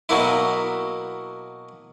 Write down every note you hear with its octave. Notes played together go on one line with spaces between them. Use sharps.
B2 F#3 A#3 E4